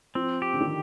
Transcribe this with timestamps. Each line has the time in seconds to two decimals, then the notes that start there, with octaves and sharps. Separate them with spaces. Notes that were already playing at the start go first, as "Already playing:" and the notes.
0.15 F3 C4
0.42 G4
0.53 D3
0.60 D#3